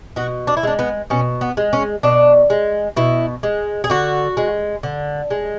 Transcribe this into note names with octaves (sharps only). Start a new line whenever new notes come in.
B2 F#4
D4
E4
G#3 D4
B3
B2 C#4
B3
G#3
C#4
B2 D4
G#3
B2 E4
G#3
G#4
D3 F#4
G#3
D3
G#3